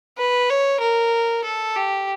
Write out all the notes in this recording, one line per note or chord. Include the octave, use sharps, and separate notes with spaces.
B4
C#5
A#4
A4
G4